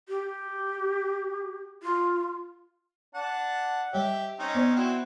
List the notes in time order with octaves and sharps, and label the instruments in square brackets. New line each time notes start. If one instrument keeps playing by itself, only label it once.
[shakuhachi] G4
F4
[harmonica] D4 F#5 A5
[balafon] G3 C#5 [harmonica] G4 E5
[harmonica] C4 C#4 D#4
[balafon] B3 C5 D5
[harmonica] C4 E4 F#4